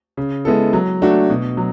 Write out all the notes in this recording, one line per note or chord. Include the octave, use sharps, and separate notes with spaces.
C#3
G#3 B3 E4 A4
F#3
A3 D4 F#4
B2
F#3